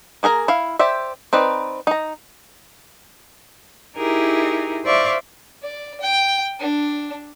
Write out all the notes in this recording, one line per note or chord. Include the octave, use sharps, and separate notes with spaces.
A#3 G#4 A#4 A#5
E4 F5
G4 C5 D5 E5
C4 D#4 B4 D5
D#4 A#5
D#4 E4 G4 G#4 A#4
C5 D5 E5 F5 C#6 D6
D5
G5
D4